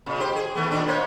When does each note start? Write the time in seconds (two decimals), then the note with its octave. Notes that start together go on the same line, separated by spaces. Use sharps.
0.06 A#2 C#3
0.20 G4 C5
0.36 G#4
0.55 D#3 A3 B3
0.71 A#2 C4 D4
0.87 A#3 C5 C#5